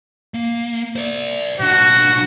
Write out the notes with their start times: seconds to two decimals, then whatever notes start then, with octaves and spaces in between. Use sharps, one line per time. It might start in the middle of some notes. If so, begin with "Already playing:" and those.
0.34 A#3
0.96 C5 D5
1.60 B1 D4 F#4